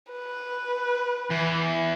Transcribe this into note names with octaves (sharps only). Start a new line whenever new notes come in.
B4
E2 E3